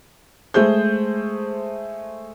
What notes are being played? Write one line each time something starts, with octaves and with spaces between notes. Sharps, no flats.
G#3 A3 G#4 C5 G6